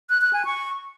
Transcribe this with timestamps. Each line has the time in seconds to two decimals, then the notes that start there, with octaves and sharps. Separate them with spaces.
0.10 F#6
0.21 F#6
0.33 G#5
0.45 C#6